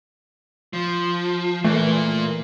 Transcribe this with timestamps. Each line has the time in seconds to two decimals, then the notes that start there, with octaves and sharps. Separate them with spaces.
0.73 F3
1.64 A#2 E3 A3 A#3